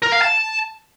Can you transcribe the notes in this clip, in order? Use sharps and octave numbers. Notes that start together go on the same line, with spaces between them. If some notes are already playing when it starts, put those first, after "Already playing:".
A#4
F5
A5